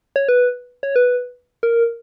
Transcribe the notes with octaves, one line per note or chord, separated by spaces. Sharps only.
C#5
B4
C#5
B4
A#4